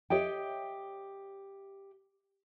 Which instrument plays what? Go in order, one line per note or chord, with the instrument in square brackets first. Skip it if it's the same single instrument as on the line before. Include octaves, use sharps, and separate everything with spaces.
[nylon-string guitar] G4 C#5 D#5 E5 G5